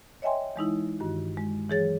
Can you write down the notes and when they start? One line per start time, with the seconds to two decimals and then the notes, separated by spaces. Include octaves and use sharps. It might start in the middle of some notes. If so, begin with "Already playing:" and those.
0.22 C#5 D#5 E5 G5 G#5 C6
0.56 E3 G#3 D#4 E4
1.00 G2 D#3 F#4
1.37 G#3
1.70 E3 F#3 G#4 C#5 A6